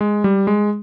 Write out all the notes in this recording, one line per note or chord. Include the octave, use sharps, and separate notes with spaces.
G#3
G3
G#3